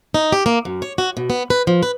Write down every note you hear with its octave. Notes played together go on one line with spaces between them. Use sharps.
D#4
G4
A#3
F#2
C#5
F#4
B2
B3
B4
F3
B4